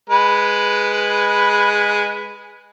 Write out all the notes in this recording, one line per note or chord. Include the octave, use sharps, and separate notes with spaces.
G#3 B4 B5